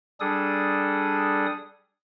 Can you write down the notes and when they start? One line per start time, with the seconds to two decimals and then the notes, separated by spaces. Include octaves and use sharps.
0.20 G3 D4 G#4 A4 D#6